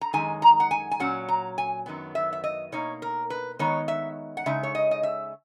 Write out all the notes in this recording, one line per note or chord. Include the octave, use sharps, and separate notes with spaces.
A#5
F#2 D#3 G#3 D#4 G#5
A#5
F#5
G#5
G#5
A#2 F#3 C#4 F#5
A#5
G#5
F#2 D#3 F#3 B3
E5
E5
D#5
B2 A#3 D#4 C#5
A#4
B4
D#3 G#3 B3 D#4 C#5
E5
F#5
C#3 G#3 D#4 E5
C#5
D#5
D#5
E5